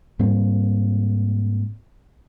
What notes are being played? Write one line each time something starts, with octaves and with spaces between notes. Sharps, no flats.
G#2 G3 A#3 C4